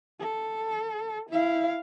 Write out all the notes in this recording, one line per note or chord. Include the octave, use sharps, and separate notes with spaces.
A4
E4 F5